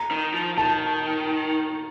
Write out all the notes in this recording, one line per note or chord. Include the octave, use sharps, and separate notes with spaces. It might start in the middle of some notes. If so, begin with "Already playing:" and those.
Already playing: A#5
D#3
F3
D#3 A5